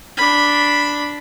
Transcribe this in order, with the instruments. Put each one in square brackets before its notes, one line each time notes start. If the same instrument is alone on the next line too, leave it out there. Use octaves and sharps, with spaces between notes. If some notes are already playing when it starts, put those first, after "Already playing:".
[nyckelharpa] D4 B5